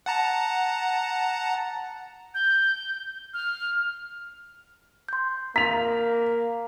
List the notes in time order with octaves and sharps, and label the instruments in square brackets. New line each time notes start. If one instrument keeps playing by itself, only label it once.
[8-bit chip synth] F#5 A5 A#5
[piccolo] G6
F6
[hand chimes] C6 G6
[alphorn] A#3 [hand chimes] A#5 [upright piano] B6 F7